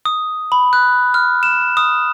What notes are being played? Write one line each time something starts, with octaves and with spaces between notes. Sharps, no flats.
D#6
B5
F#6
F6
E7
D#6